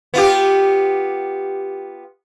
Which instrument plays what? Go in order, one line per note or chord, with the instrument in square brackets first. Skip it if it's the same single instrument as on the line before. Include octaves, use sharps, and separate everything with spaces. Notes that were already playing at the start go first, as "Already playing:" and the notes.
[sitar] B3 F4 G4